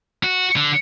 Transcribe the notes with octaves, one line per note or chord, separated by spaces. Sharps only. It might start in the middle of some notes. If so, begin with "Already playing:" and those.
F#4
D3